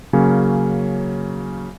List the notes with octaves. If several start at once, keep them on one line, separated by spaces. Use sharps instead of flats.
C#3 F#3 A#3 C#4